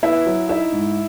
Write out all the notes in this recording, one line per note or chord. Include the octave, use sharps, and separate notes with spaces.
B3 E4 E5
F#3
D#4 E4 E5
G#2